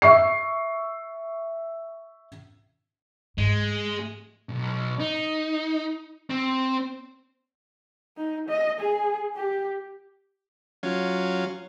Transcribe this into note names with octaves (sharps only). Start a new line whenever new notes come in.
E5 C#6 C7
G#2 G#3
B1
D#4
C4
D#4
D#5
G#4
G4
F#3 C#4 F4